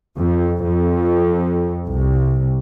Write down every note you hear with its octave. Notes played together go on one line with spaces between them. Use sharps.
F2
F2
C2